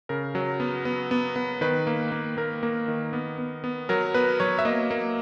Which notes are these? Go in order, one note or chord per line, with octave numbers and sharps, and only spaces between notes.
C#3 A#4
F#3
B3
B3
B3
B3
D#3 B4
A#3
A#3
A#3 A#4
A#3
D#3
B3
B3
B3
F#3 A#4
B3 B4
F#3 C#5
E5
A#3 D#5
A#3